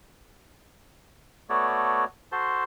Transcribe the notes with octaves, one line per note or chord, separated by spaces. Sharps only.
A3 B3 F#4 A4 C#5 D5
F#4 A4 C5 A5 C6